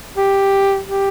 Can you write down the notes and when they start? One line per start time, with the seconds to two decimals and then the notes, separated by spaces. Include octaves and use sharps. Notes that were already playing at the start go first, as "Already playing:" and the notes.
0.17 G4
0.86 G4